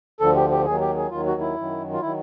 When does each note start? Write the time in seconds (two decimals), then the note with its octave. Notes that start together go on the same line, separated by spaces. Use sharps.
0.20 D2 D3 F3 A4
0.35 G4
0.51 G4
0.66 D#2 D#3 F#3 G#4
0.81 G4
0.96 G#4
1.10 D#2 D#3 F#3 F4
1.26 F#4
1.41 E4
1.56 F#2 D#3 F#3
1.92 F4
2.02 D#3 F#3 E4